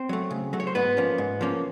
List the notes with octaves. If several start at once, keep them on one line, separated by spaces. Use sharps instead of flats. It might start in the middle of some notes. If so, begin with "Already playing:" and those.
Already playing: C4 C5
F#3 A3
C#3
F#3 A3
C#5
C5
G#2 B3 B4
F3 A#3 C#4
G#2
F3 A#3 C#4